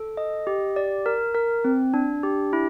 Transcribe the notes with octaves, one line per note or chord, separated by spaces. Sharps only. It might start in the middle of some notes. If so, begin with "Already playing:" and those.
Already playing: A4
D#5
G4
D5
A#4
A#4
C4
D4
G4
E4